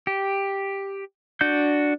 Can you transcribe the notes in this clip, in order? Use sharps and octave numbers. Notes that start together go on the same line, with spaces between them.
G4
D4 F#4 G6